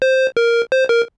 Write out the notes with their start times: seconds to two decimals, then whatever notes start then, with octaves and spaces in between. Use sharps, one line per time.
0.02 C5
0.37 A#4
0.72 C5
0.89 A#4